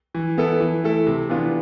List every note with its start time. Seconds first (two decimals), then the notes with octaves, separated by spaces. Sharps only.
0.15 E3
0.38 B3 E4 A4
0.60 E3
0.84 A3 E4 A4
1.07 C3
1.29 E3 B3 D4 F4